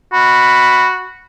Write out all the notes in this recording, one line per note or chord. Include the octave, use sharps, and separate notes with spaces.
F#4 B5